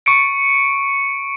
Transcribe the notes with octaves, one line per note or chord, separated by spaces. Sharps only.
C#6 C#7 D7